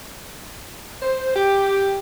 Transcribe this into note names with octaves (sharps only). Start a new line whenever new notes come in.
C5
G4